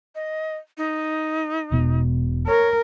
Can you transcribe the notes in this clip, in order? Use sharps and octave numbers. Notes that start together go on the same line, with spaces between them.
D#5
D#4
E1 B2
A#4 C#5